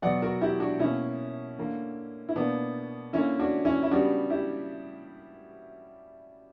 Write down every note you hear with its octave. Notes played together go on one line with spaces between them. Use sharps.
B2 F#3 B3 D5 F#5
F#4 A#4
E4 G4
D4 F#4
B2 A#3 C#4 E4
D3 A#3
E4
B2 A#3 B3 D4
D3 A#3 C#4 E4
D4 F#4
C#4 E4
E4
C#3 G3 B3 D4 F#4
E4 G4